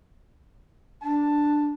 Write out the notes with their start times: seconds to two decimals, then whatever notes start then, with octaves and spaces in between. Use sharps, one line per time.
1.02 D4 A5